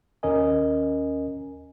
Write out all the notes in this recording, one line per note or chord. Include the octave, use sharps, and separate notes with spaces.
D#2 C#4 A#4 D#5 G#5